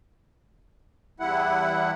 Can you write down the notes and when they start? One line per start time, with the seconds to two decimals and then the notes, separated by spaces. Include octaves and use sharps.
1.20 E2 G3 E4 F#5